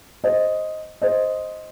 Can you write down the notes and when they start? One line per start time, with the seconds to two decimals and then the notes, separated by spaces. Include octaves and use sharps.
0.24 C5 D#5
1.02 C5 D#5